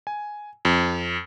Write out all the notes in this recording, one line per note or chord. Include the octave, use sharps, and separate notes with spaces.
G#5
F2